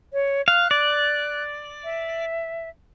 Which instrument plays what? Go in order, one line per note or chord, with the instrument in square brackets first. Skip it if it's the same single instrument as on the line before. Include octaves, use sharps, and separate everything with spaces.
[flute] C#5
[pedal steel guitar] F5 [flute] F#6
[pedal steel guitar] D5
[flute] E5